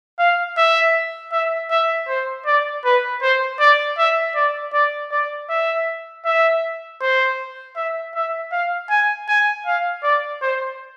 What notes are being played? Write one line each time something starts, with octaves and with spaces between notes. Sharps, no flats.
F5
E5
E5
E5
C5
D5
B4
C5
D5
E5
D5
D5
D5
E5
E5
C5
E5
E5
F5
G#5
G#5
F5
D5
C5